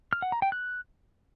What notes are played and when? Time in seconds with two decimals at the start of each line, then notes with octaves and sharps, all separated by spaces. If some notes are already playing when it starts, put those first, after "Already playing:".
0.13 F6
0.22 F#5
0.32 A#5
0.42 G5
0.52 F#6